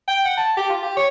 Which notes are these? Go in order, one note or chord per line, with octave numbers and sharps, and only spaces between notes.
G5
F#5
A5
G4
F4
G4
C#5